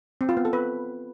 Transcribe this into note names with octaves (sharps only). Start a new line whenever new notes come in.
C4
F4
B3
A4
B4